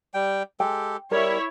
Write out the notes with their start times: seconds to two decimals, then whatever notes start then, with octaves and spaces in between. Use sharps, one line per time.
0.14 G3 G5
0.60 G#3 G4 A4 G5
1.11 G3 E4 A#4 C#5